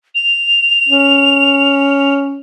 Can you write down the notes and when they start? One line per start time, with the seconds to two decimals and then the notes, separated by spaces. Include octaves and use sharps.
0.15 F7
0.89 C#4